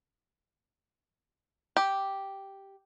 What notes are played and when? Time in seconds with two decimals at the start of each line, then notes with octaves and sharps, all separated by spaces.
1.77 G4